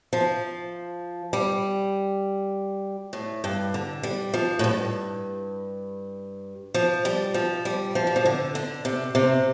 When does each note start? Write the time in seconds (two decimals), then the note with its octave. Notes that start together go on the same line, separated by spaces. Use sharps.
0.13 F3
1.33 G3
3.13 A2
3.44 G2
3.74 D3
4.03 G3
4.34 F3
4.59 A2
4.64 G2
6.74 F3
7.05 G3
7.34 F3
7.65 G3
7.95 F3
8.07 G3
8.16 F3
8.25 D3
8.55 D3
8.85 C3
9.15 C3